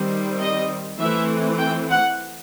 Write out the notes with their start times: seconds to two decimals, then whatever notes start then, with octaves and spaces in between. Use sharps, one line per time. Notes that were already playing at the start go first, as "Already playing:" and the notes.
Already playing: D#3 G3 C4
0.40 D#5
0.99 E3 A3 C4 E5
1.59 G5
1.89 F#5